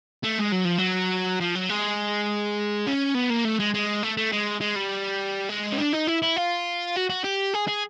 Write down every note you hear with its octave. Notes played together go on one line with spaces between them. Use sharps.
A3
G#3
F#3
F3
F#3
F3
F#3
G#3
C#4
B3
A#3
A3
G#3
G#3
A3
A3
G#3
G#3
G3
G#3
C#4
D4
D#4
E4
E4
F4
F#4
F#4
G4
G#4
G#4